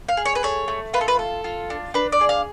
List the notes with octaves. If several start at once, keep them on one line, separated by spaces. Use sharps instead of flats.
F5
G#4
C#5
B4
A3 C#5
A3
F4 B4
A4
B4
A4
F4
D4
D4 B4
D5
G#4
F5